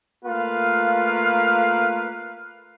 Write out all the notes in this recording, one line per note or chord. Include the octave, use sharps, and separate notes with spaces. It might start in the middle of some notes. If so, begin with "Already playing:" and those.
A3 A#3 F4 B4 F5